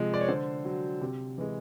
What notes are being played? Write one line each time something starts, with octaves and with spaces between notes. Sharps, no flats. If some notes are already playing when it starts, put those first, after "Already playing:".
Already playing: C3 F3 G#3
D5
C#5
D3 C5
F#3
C3
E3 G#3